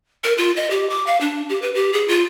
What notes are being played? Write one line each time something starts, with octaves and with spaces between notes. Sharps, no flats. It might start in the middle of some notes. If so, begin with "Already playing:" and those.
A#4
F4
D#5
G4
D6
F5
D4
G4
B4
G4
G#4
F4